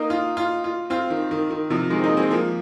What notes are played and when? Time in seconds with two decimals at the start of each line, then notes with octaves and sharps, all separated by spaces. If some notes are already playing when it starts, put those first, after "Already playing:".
Already playing: A#3 D#4
0.10 F4
0.37 F4
0.64 F4
0.90 C4 F4
1.10 D#3
1.31 D#3
1.51 D#3
1.70 C3 F3
1.90 D#3 G#3
1.99 C4
2.04 A#3 D#4
2.17 G#3 C4
2.31 F3 A#3